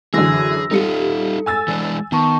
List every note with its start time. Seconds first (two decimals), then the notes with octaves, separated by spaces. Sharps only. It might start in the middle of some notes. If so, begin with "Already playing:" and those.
0.14 F#2 D3 E3 G#4 E6 A#6
0.71 G3 D#4 F4 A4 C#7
1.46 G#5 E6 A6
1.68 E3 G#3 D4
2.12 D#3 B3 A5 C#6